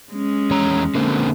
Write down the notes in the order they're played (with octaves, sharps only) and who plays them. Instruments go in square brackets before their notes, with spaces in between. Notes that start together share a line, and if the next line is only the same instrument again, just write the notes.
[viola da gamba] G#3 C#4
[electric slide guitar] E2 C#5 A#5
D3 A#3 C4